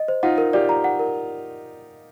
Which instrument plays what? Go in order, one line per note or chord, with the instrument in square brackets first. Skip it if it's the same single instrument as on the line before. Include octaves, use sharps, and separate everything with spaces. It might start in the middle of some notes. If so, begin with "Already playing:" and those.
Already playing: [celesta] D#5
C5
[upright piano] D#4 F4 [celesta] F#5
[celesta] A#4
[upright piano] F4 G4 [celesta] D5
[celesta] A#5
F#5
A#4